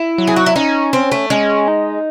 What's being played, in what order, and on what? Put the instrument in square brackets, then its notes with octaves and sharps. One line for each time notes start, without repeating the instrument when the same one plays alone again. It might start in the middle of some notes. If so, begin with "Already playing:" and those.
Already playing: [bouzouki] E4
[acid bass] F#3
[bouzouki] G#4
F#4
E4
[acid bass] C#4 [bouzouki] D#4
[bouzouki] C4
A3
[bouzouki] G#3 [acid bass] C#4
[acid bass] D#4